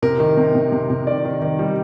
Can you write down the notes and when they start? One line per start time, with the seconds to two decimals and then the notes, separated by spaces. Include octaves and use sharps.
0.02 C3 A#4
0.20 D#3
0.37 C3
0.55 C3
0.72 C3
0.90 C3
1.07 D#3 D5
1.25 D#3
1.42 D#3
1.59 G3